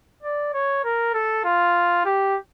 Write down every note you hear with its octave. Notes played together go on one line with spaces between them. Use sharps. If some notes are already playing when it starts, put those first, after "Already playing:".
D5
C#5
A#4
A4
F4
G4